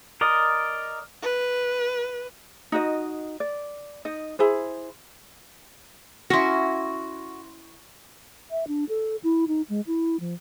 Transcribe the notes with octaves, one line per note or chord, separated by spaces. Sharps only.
A#4 D5 D#5
B4
D#4 F#4 D#5
D5
D#4 D#5
E4 G#4 C5
C#4 E4 F#4 C6 A#6
E5
D4
A4
E4
D#4
G#3
E4
F3